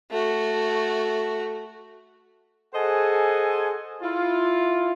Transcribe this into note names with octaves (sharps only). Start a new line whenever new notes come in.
A3 F#4
G#4 A4 C5 D#5 F#5 G#5
E4 F4